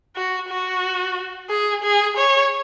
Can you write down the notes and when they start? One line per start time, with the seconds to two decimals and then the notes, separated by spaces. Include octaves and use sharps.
0.16 F#4
0.49 F#4
1.50 G#4
1.83 G#4
2.17 C#5